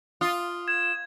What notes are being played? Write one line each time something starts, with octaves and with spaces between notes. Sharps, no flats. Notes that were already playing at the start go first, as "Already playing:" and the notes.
F4 D#6
G#6 E7